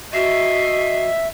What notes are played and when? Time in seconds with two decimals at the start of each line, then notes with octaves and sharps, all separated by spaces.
0.13 F#4 D#5 E5 C7